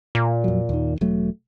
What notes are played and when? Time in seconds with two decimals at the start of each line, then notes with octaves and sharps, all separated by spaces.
0.15 A#2
0.44 F2 F#3
0.69 D#2 D#3
1.01 E1 F#3 A3